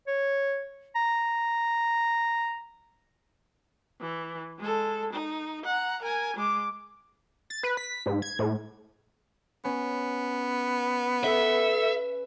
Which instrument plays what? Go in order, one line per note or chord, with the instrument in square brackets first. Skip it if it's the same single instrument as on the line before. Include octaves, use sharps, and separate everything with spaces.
[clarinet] C#5
A#5
[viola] E3
G#3 A4
D#4
F#5 A#5
A#4 G#5
G#3 D6
[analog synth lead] A6
B4
B6
G#2
G#6
A2
[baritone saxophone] B3 [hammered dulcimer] C#4
[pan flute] A4 [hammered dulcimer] B4 [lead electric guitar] E5